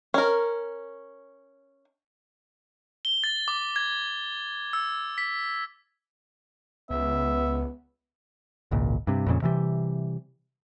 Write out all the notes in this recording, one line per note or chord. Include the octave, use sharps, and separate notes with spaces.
C#4 A#4
G7
A6
D6
G#6
E6
B6
C#2 B3 E5
G#1 C#2 A#2
G2 C3
F2 A#2 C#3
C3 E3 F3 G3